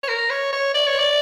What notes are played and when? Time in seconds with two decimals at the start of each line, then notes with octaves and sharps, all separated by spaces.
0.03 C#5
0.08 A#4
0.30 C#5
0.53 C#5
0.74 D5
0.87 C#5
0.99 D5